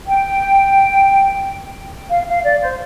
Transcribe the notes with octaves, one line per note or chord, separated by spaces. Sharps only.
G5
F5
F5
D5
C5